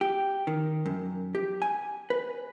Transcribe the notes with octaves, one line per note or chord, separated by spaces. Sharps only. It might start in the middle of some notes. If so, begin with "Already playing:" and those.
G4
D#3
F#2
G4
G#5
B4